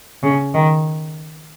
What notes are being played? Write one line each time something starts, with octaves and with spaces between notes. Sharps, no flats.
C#3
D#3